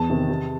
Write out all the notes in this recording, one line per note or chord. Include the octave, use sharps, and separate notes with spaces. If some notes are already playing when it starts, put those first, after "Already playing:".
Already playing: E2 A5
C3 D#3
C3